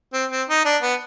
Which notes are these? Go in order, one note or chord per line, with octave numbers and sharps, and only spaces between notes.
C4
C4
D#4
D4
B3